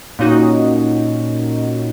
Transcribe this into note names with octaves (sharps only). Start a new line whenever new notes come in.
A#2 C#4 D#4 F#4